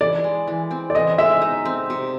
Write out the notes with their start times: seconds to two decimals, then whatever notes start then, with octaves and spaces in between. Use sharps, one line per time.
0.01 E3 D5
0.24 G#3
0.48 E3
0.71 C4
0.90 D5
0.95 E3 D#5
1.18 G#3 E5
1.42 D#4
1.65 C4
1.90 C3